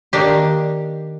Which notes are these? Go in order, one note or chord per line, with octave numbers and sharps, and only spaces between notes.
D#3 A#3 D4 G4